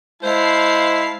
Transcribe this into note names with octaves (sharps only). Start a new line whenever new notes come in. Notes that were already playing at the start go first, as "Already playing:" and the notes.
G#3 E4 C5 F5 A5 C7